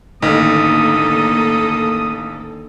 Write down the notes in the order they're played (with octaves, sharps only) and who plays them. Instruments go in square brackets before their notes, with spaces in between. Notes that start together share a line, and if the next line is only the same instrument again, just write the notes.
[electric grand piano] A1 [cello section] D3 A#3 A4 [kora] D#3 [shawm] D#6